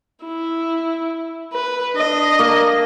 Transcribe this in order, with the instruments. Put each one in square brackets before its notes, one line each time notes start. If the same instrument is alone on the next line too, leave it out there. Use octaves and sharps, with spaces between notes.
[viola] E4
B4
D4 D#5
[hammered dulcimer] A#3